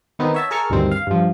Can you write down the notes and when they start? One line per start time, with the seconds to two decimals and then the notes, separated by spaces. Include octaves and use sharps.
0.19 D#3 B3 C4 D#4
0.34 C#5 E5 A5
0.51 G#4 A#4 A5 C#6 E6 F6
0.70 D2 G2 D#3 C4
0.91 F5
1.07 G2 F3